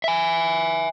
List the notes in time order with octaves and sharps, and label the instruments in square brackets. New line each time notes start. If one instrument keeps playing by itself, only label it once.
[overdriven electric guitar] E5 G#5